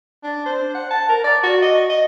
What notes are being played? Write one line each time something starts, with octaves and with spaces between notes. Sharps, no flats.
D4
C5
F#5
A5
A#4
D5
F#4
D#5
D#5